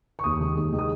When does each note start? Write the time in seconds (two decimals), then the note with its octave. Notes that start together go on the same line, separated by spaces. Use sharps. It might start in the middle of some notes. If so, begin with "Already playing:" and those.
0.19 C#6
0.24 D#2 D#6
0.40 D#3 G#3
0.56 D#2
0.72 D#3 G#3
0.79 D#6